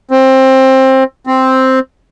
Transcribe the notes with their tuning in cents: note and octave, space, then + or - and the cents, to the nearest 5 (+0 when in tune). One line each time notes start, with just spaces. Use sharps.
C4 +15
C4 +0